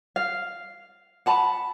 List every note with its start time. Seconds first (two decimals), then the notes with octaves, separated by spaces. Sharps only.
0.16 F5
1.26 F#5 A5 B5